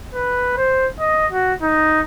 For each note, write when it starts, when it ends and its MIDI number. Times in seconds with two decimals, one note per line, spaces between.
0.15 0.57 71
0.57 0.87 72
1.00 1.27 75
1.32 1.54 66
1.62 2.01 63